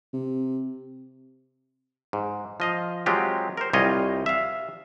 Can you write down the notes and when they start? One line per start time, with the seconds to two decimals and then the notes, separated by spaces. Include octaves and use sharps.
0.13 C3
2.13 G#2
2.60 F3 D#5 F5
3.06 F#3 G#3 C4 F4 G4
3.57 A#4 C5
3.73 C2 G3 F4 C#5 D#5 G#5
4.26 E5 F5